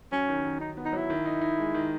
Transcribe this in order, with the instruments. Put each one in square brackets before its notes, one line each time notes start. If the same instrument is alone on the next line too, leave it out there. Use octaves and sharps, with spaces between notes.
[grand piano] F#3 [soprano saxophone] C#4
[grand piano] D#3
D#3
[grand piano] D#3 [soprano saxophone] D#4
[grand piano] B3
[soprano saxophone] D#4
[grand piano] F#3 [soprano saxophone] E4
[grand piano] D#3
D#4
D#4
G#3
D#3